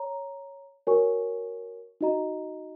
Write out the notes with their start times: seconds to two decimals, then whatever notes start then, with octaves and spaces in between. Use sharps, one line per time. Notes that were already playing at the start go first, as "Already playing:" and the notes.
Already playing: C#5 A#5
0.87 F#4 A#4 C#5 G#5 C#6
2.01 D#4 F#4 D#5 A#5